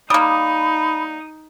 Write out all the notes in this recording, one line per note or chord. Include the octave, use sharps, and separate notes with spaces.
G3 A#3 D#4 B5 D#6